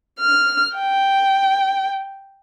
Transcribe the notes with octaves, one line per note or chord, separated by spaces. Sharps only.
F6
G5